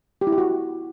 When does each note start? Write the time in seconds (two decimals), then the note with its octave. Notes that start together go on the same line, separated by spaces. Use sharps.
0.21 G4
0.27 E4
0.32 G4
0.38 F#4